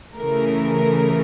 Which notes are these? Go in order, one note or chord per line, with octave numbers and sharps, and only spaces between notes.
C#3 E3 A3 A#4